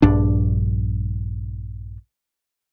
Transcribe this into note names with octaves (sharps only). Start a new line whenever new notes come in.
A#1 G2 D4